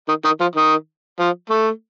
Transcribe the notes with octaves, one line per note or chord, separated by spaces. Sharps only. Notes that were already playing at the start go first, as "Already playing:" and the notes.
D#3
D#3
F3
D#3
F3
A3